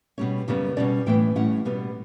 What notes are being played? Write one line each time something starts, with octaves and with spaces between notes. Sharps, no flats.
B2 G3 C#4 C#5
F#2 C#3 G3 B3
B2 G3 C#4 D5
A2 E3 B3 G5
A2 G3 C#4 F#5
B2 G3 B3